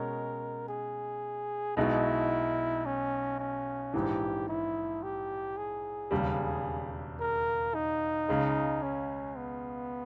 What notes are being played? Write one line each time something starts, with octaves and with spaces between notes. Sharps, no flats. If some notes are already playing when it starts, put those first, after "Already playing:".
Already playing: B2 G#3 C#4 A#4
G#4
B1 B2 G#3 D#4 E4
C#4
C#4
A#1 G#2 E3 G4
E4
G4
G#4
E1 D#2 C#3 G3
A#4
D#4
C#2 C#3 G#3
C#4
B3